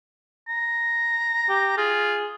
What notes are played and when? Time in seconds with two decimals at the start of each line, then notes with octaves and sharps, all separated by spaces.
0.48 A#5
1.49 G4
1.77 F4 G#4